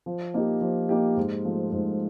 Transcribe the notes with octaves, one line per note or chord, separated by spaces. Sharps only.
F3
A#3 D#4 G4
F3
A#3 D#4 G4
G#2
F3 A3
G#2